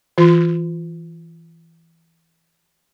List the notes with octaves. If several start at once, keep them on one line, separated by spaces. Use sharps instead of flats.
E3 F4